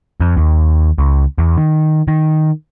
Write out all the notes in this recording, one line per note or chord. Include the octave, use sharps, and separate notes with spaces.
F2
D#2
C#2
E2
D#3
D#3